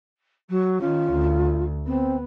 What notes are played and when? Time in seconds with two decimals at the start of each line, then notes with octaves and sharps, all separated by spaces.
0.49 F#3
0.80 D#3 C#4 F4
1.12 D2
1.86 B3 C4